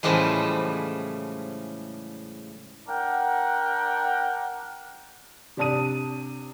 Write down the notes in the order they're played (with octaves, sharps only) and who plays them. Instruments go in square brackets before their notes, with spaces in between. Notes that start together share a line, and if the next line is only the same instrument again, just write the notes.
[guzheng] A2 C#3 E3 F3 G3 G#3
[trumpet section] D4 A#4 F#5 G5
[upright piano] C3 D4 A5 D#6 D#7